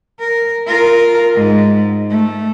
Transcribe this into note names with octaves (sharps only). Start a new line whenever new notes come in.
A#4
F4 A#4
G#2
A3